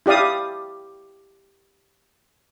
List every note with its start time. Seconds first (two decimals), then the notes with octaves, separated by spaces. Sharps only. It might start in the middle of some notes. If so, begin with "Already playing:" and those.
0.06 E4 G4 D5 F5 D#6